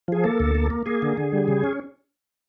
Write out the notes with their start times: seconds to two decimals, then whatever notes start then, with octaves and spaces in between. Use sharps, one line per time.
0.08 F3 G#4
0.24 A#3 A4
0.40 D2
0.55 A#3
0.70 A#3
0.86 A#3 G#4
1.02 D3
1.17 D3
1.33 G3
1.48 C#3
1.64 C#4